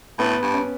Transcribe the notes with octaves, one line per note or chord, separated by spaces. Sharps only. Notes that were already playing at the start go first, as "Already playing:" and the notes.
A2 B3
G2
C#4